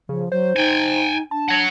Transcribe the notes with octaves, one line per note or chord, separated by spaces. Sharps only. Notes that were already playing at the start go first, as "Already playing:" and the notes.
C#3 F3
F#3 C5
D#4 G5 G#5
D4 A5
C#5 F#5